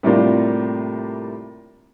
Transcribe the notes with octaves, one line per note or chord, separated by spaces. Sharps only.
A2 C3 G3 A#3 D4 F4